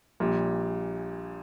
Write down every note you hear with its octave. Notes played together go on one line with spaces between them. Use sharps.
A#1 A#2 G3